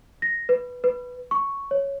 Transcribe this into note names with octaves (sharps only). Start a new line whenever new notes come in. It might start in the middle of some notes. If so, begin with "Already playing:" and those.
A#6
B4
B4
C#6
C#5